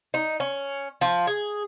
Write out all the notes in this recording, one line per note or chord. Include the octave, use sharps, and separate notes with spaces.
D#4
C#4
F3
G#4